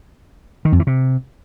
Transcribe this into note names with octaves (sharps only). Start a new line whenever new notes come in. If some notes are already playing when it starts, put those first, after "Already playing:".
D#3
F2
E3
C3